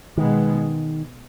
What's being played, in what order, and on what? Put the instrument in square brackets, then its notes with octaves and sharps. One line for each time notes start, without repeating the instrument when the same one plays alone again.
[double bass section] B2 G#3 B3 [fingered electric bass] D#3